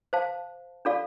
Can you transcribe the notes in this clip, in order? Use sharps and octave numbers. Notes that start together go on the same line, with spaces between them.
C5 F5 A5
D4 F4 A4 D5 F5